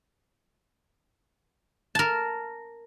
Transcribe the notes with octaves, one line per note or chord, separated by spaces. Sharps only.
A#4 A5